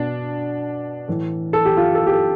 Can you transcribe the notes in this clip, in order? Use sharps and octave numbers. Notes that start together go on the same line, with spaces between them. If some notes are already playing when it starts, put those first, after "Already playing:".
Already playing: B2 D4
A2 E3
A4
G4
F4
A4
G4
A4